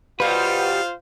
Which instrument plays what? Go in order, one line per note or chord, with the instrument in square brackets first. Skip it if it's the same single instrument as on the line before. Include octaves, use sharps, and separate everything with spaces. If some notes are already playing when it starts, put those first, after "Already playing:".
[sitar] B2 G3 [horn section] F4 C5 F5 [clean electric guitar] B4